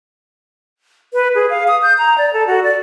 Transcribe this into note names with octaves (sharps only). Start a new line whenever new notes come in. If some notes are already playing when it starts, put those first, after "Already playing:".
B4
G#4
F5
D#6
G6
A#5
D5
A4
F#4
D5